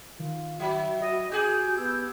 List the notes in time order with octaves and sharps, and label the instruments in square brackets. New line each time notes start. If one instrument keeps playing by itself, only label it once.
[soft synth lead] D#3 [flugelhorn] F4
[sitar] F#3 [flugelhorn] E5
[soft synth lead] F#4 [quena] D#5
[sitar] G4 G#4 [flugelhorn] G#5 [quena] G6
[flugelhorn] B3 [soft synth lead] E6